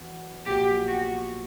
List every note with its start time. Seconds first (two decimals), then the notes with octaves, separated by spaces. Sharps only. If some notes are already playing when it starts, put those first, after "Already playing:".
Already playing: E2 F#3 B3
0.46 A#1 A#2 F#3 B3 G4
0.87 F#4